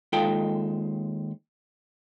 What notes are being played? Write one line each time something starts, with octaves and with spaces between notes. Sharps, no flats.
D#2 G#3 D#4 F4 A4 G5